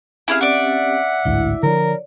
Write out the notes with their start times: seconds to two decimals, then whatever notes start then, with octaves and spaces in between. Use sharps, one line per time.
0.28 C4 C#4 E4 G4 G#4 F5
0.41 D5 E5 F#5
1.25 A1 D2 G#2 E4
1.63 D3 F3 A#4 C#5 D5